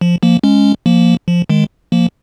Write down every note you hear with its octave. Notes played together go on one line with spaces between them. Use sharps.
F3
F3 A#3
G#3 C#4
F3 A#3
F3
D#3 G#3
F3 A#3